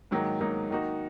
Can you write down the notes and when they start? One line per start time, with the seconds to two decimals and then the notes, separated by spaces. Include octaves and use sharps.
0.11 G#2 D#3 F#3 A#3 D#4
0.40 G#2 D#3 F#3 A#3 D#4
0.70 D#3 A#3 D#4 F#4